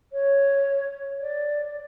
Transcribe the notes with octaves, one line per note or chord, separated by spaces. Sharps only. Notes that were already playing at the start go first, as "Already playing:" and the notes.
C#5
D5